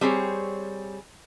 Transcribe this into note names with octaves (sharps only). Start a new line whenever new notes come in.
G3 C4 G#4 C#5